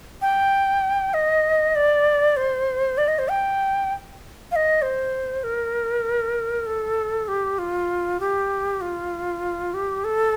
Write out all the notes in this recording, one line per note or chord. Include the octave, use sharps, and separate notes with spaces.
G5
D#5
D5
C5
D5
D#5
C5
G5
F5
D#5
C5
A#4
A4
G4
F4
G4
F4
G4
A4